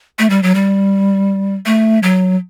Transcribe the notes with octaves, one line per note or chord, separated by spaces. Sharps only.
A3
G3
F#3
G3
A3
F#3